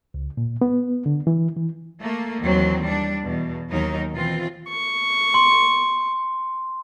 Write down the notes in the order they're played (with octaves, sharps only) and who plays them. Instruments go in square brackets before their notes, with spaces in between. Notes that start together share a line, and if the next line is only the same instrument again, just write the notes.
[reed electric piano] C#2
A#2
B3
D3
E3
E3
[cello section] A3 A#3
D#2 D#3 E3 F#3 C4
G3 D4
E2 B2
D#2 F#3 D#4 A#4
B2 D#3 E3 C4 F4
[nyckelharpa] C#6
[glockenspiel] C6